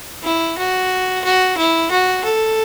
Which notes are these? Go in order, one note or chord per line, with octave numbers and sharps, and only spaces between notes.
E4
F#4
F#4
E4
F#4
A4